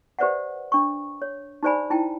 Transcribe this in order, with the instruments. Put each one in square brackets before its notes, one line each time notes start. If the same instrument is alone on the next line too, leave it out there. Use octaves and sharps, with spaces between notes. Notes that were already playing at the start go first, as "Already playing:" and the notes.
[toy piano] G4 B4 C5 D5 E5 F#5
D4 C#6
C#5
D#4 G4 C5 D5 G#5 B5
D#4 E4 G5 A5